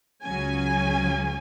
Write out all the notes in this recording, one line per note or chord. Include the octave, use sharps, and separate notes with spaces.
C#2 C#3 F#3 C#4 G#5